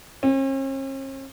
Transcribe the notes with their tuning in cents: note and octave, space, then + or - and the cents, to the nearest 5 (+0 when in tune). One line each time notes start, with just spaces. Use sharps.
C#4 -45